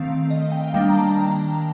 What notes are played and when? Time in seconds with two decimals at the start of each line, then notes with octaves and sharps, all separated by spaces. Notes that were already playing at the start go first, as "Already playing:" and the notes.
Already playing: D#3 A3 C4 F5
0.30 D#5
0.52 G5
0.67 F5
0.73 D#3 G3 A#3 D4 G5
0.89 A#5
0.96 A5
1.17 A#5